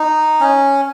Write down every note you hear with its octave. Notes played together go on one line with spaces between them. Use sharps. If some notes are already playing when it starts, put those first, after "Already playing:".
Already playing: D#4
C#4